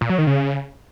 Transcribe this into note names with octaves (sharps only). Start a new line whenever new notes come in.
A#2
F#3
D#3
C#3